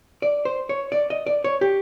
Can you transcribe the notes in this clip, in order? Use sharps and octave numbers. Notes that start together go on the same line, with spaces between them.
D5
C5
C#5
D5
D#5
D5
C#5
G4